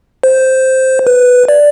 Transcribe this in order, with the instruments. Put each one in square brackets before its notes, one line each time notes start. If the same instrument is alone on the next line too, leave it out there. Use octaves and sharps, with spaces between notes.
[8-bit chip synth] C5
B4
D5